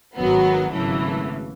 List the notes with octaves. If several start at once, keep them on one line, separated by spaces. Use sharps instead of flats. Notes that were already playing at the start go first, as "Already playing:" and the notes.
G#1 F#2 D#3 F#3 B3
G#1 F#2 C#3 E3 A3